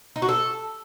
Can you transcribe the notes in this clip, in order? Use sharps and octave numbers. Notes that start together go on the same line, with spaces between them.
D#4
F#4
A4